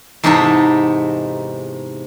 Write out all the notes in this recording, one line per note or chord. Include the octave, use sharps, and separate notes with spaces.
E2 G#2 C3 D#4 A4 E5